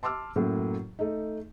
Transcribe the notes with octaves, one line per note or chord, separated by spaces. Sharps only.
A5 C6 D6 E6 F6
F#2 A2 F#3 A#3
A3 D#4